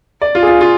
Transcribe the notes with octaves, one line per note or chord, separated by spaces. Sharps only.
D5
F4
G#4
F4
F4